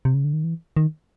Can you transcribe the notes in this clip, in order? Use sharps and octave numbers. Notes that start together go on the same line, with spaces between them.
C3
C#3
D3
D#3
E3
D#3